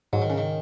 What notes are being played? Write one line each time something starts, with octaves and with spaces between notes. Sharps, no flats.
G#2 F#3
D#3
C#3
D#3